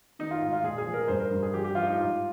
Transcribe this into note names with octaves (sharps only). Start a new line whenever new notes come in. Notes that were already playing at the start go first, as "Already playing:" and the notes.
D#3 D#4
F4
G#2 F4
F4
A#2 G#4
G#4
F3
A#4
G2 C5
A#4
G2
G#4
F3 G4
G4
F3 F4
D#4
G#2 F4